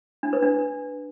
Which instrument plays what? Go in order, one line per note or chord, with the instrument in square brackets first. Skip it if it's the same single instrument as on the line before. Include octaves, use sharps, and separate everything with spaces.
[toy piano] D4
B4
D4